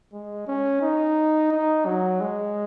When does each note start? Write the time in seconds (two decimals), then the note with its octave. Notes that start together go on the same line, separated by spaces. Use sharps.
0.13 G#3
0.47 C#4
0.82 D#4
1.52 D#4
1.86 F#3
2.21 G#3